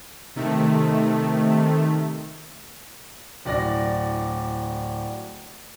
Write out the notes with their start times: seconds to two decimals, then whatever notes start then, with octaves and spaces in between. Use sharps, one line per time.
0.36 C3 D#3 A3
3.45 D1 D5 A#6